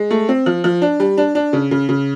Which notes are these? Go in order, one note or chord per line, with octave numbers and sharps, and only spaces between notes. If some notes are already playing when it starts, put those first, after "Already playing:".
Already playing: G#3
A3
C4
F3
F3
D4
G3
D4
D4
C#3
C#3
C#3